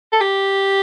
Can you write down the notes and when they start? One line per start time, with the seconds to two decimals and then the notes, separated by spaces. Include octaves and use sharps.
0.13 A4
0.21 G4